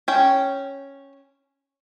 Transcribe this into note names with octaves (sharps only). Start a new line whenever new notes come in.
C#4 G5